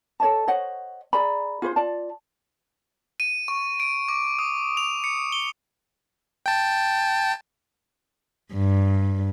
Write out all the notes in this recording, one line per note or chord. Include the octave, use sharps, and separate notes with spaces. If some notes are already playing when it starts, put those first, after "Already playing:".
A4 C#5 D#5 A5
C5 C#5 D#5 F#5
G#4 D5 A#5 B5
F4 G#4 B4 C5
F4 D5 A5
D#7
C#6
D7
D6
D#6
F7
C#7
G7
G5 A5
G2